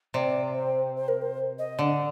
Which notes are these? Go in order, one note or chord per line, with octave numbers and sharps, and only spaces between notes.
C3 D5
C5
C5
A#4
C5
D#5
D3 D5